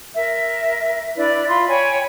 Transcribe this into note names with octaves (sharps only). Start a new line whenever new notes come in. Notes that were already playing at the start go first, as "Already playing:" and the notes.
A#4 E5
D4 E4 B4 D5
F4 B5 C6
C#5 G5 G#5 B5